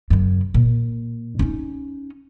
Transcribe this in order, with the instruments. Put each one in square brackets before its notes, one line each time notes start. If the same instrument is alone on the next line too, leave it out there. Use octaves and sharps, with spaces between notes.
[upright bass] F#2 C#3
A#2
C#4 D#4